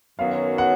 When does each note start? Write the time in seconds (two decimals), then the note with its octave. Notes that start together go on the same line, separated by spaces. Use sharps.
0.19 F#2 D#3 F#3 B3 F#4 F5
0.58 F#5